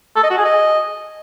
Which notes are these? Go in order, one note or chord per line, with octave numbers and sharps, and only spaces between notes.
A4
D#5
F#4
G#4
D#5